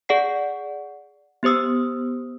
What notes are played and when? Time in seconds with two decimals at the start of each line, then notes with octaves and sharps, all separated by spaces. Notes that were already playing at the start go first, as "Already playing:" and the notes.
0.09 G#4 D5 F#5 C7
1.43 B3 G4 C5 D#6 E6